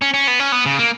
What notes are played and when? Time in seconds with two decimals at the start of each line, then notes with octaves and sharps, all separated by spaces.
0.02 C#4
0.14 C#4
0.28 B3
0.40 C#4
0.52 B3
0.66 C#3
0.79 A#3